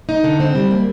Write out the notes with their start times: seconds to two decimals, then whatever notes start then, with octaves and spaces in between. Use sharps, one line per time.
0.09 D#4
0.24 D3
0.40 C4
0.55 G3
0.71 A#3